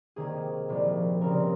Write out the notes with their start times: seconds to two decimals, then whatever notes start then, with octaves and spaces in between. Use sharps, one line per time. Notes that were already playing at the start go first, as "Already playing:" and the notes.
0.16 C3 D#3 A#3 G#4
0.69 C2 A#2 F3
1.21 C#2 C#3 G3 C4 A#4